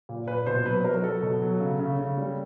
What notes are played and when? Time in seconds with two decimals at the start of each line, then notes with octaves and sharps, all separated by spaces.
0.09 A#2
0.27 A#2 B4
0.46 B2 C5
0.65 F#3 B4
0.84 F#3 A#4
0.97 A#4
1.04 F#3 A4
1.22 B2
1.41 F#3
1.60 C#3
1.79 C#3
1.99 C#3
2.17 G3